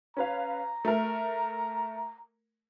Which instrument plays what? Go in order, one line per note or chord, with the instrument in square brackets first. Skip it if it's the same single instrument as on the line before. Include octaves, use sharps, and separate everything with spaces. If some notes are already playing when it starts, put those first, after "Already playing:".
[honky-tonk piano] C#4 B4 F5 [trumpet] A#5
[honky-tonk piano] A3 A#4